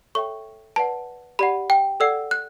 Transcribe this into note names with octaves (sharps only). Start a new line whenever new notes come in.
A4 C#5 E5 G5 C#6
B4 D5 F#5 A5
G4 D5 F#5 B5
G5
A4 D5 F#5 E6
F#6